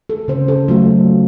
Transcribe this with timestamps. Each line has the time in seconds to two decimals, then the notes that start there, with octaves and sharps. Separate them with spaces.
0.10 A4
0.28 C#3 C5
0.48 A4
0.68 F#3 A3 F4